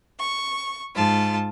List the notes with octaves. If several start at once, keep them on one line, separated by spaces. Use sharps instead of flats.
C#6
G#2 F4 A5